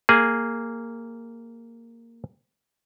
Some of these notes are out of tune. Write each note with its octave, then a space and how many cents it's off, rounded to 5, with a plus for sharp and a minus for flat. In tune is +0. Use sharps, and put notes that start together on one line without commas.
A#3 -10 G#4 +0